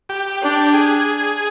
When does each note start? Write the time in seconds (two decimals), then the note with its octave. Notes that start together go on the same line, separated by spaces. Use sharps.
0.09 G4
0.42 D4
0.74 G#4